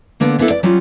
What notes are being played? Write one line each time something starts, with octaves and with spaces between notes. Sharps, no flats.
D3 A#3 B3 D4 A4
A#3 B3 D4 E4 G#4 A4
D5
F#3 G3 C#4 F4 F#4